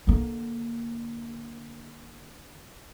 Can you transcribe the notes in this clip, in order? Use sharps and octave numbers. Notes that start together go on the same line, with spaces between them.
D3 A#3